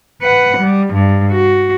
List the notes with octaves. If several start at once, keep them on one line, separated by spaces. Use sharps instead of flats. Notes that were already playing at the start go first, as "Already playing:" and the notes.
B4 F#5
G3
G2
F#4